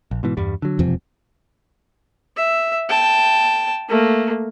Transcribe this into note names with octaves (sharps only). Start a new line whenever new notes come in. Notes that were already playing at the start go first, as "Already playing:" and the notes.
A#1
G#2 B2 E3
E2 G2 G3
D3 F#3
E1 F2 C3 F3
E5
G5 A5
A3 A#3